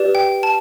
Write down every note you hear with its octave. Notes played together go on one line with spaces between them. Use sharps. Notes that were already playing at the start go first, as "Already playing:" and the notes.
Already playing: G4 B4 D5
G5
A5